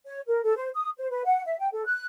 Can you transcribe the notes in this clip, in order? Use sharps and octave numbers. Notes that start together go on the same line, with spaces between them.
C#5
A#4
A4
C5
D#6
C5
B4
F#5
E5
G5
A4
F#6